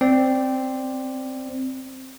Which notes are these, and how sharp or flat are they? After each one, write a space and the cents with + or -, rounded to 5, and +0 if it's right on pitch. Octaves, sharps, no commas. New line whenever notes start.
C4 +0 D5 +0